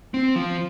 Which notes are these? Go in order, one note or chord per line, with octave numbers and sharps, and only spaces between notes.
C4
F3